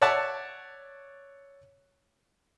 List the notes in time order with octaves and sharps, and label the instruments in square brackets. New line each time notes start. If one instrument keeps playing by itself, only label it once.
[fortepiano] C#5 D5 E5 F#5 A5 C#6